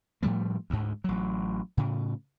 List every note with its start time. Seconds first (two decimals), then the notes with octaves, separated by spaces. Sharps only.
0.23 A2 F3 G3 A3
0.70 D2 G#2
1.04 A1 F#3
1.77 A2 C#3